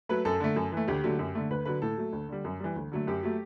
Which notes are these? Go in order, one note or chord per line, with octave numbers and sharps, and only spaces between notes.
F#3 A3 B4
F#2 A4
D3 A3
F#2
E3 A3
D2 G4
D3 F#3 A3
F#2
D3 A3
D2 B4
D3 F#3 B4
A2 A4
F#3 A3
D2
D3 G3
F#2
E3 G3
D2
D3 F#3 A3
F#2 G4
F#3 A3